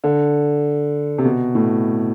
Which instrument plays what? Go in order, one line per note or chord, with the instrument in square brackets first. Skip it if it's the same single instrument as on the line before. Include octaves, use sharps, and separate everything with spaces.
[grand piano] D3
C3
B2
A2